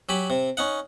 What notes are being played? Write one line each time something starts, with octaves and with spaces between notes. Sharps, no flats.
F#3 G4 G#5 B5
C3
C#4 D#4 F#5